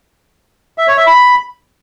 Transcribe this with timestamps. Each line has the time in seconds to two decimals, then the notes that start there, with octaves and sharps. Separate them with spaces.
0.78 E5
0.88 C#5
0.97 E5
1.07 B5